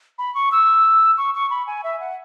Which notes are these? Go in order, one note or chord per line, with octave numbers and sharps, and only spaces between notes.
B5
C#6
E6
C#6
C#6
B5
G#5
E5
F#5